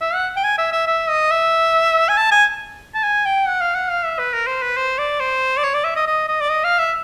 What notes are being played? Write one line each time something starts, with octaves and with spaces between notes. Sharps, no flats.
E5
F#5
G5
G#5
E5
E5
E5
D#5
E5
G#5
A5
G#5
A5
G#5
G5
F#5
F5
F#5
F5
E5
B4
A#4
C5
B4
C5
D5
C5
D5
C#5
D5
E5
D#5
D#5
D#5
D5
D#5
F5
E5